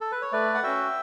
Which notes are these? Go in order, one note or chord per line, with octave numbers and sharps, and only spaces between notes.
A4
B4
C#5
A3 B4 D5
F#5
C#4 F#4 E5 G5